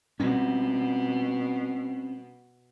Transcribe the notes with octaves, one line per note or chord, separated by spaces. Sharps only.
B2 G3 C4 C#4